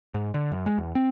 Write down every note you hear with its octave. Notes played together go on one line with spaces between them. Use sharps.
G#2
D3
F#2
G#3
E2
C4